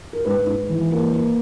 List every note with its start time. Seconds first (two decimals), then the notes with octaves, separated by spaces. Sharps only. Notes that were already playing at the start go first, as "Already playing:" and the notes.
0.13 A#4
0.25 G#2 B4
0.46 G#2
0.69 E3
0.91 A#3
1.12 A#3